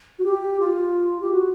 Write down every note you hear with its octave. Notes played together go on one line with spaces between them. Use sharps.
F#4
G4
F4
G4
F#4